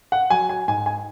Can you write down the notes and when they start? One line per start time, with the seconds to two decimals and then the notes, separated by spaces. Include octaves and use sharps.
0.12 F#5
0.30 F#3 G#5
0.49 G#5
0.68 G#2 G#5
0.86 G#5